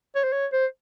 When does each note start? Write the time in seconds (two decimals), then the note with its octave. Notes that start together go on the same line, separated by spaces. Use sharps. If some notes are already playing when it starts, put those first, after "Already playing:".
0.15 C#5
0.24 C5
0.33 C#5
0.53 C5